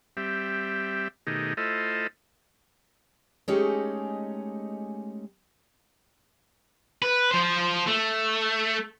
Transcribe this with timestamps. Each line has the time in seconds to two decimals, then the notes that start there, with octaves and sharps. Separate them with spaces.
0.17 G3 C4 G4 E5
1.27 B2 D#3 A3 D#4 G4 G#4
1.57 A3 E4 F4 A4 C5 D#5
3.48 G#3 A3 C#4 D#4 G4 G#4
7.02 B4
7.31 F3 C5
7.87 A3